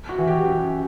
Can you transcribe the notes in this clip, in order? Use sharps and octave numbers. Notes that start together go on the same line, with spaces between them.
F#4
E3
G4
F#2